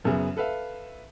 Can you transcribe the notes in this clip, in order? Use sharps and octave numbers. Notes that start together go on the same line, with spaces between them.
F#1 F#2 B3 G#4
A4 B4 E5 F5